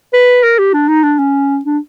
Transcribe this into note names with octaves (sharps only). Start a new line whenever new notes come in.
B4
A#4
G4
D4
D#4
D4
C#4
D4